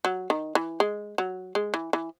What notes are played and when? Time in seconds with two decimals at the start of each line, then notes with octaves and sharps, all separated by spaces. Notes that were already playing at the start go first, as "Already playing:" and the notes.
0.05 F#3
0.30 D#3
0.55 E3
0.80 G#3
1.18 F#3
1.55 G#3
1.74 E3
1.93 E3